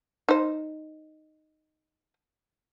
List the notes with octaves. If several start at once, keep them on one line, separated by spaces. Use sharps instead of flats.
D#4 C5